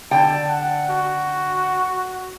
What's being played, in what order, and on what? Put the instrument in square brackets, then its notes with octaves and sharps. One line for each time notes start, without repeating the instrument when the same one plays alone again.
[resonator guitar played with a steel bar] D3 G5 [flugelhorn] A5
[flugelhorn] F#5
F#4